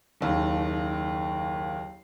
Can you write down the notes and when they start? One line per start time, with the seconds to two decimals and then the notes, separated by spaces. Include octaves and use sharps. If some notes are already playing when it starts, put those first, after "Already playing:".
0.21 F#1 D#2